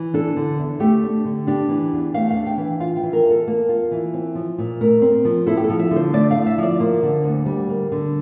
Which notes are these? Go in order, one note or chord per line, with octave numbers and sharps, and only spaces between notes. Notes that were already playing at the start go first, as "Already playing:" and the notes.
Already playing: E3
D4 A4
D3
E2
A3 G4
D4
D3
D4 G4
E3
E2
A3 F5
F5
D4
G5
E3
F4 F5
G5
E3
A#4
E2
A4
A#3
F4
E3
C4
F3
A#2
A3 A#4
C4
F3
E4 A4
G4
A4
F3
E5
D3
C5
A3 D5
E4 F5
E5
F3 D5
A#3 C5
D3
D2
G3
A#3
D3